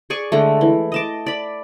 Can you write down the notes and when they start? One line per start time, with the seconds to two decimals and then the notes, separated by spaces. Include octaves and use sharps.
0.10 G#4 D5 G#5 C#6
0.32 D3 G#3 A3
0.61 E3
0.92 D#5 A5 D6
1.26 D5 B5